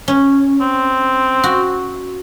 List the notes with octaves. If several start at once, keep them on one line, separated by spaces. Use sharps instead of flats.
C#4
C4
F#4